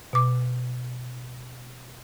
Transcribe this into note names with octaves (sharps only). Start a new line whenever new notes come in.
B2 D6